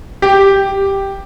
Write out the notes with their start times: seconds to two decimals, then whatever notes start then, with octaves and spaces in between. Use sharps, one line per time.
0.22 G4